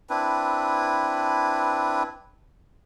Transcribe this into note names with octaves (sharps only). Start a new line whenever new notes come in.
C4 D4 E4 B4